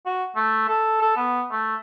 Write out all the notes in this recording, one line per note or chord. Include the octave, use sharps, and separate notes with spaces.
F#4
A3
A4
A4
B3
A3